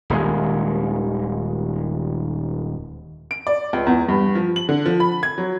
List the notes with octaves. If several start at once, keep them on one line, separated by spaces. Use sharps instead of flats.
D#1 D#2 G#3
D7
D5
C#2
E2
G2
F3
F#7
D3
F3
B5
G#6
F#3